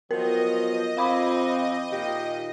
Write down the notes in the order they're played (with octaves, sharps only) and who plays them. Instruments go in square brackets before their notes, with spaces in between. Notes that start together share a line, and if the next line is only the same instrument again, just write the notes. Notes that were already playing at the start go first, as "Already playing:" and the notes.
[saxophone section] F3 F#3 B3 [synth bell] A#4 [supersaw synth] D#5
[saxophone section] F2 F3 C4 [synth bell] F5 B5 D6
[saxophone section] A#2 D#3 G4